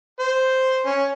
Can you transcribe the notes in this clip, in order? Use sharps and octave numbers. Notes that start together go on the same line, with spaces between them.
C5
C#4